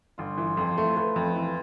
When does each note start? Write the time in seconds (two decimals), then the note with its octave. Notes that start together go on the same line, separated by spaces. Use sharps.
0.18 G1 F4
0.37 E3
0.57 F2 C5
0.78 A3
0.96 A3 B4
1.16 F2
1.36 E3